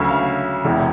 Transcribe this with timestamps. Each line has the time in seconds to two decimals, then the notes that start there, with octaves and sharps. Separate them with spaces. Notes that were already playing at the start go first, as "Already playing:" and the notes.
Already playing: D2 C#3 F#3 E5
0.10 F5
0.65 E1 E2 C3